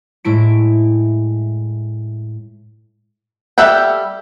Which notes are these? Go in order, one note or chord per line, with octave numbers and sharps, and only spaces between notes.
A2 G#3 E4 D7
G3 A4 E5 F#5 G5